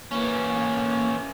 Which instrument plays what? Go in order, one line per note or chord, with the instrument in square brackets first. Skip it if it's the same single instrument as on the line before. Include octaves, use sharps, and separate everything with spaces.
[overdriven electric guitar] E3 C#4 [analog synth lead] A#3